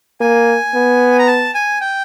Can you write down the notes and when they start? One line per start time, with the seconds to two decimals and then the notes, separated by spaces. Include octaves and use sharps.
0.20 A#3 G#5
0.74 B3
1.19 A#5
1.27 A5
1.54 G#5
1.81 G5